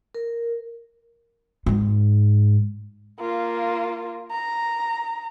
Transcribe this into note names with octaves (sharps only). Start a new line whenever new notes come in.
A#4
G#2
A#3 F4
A#5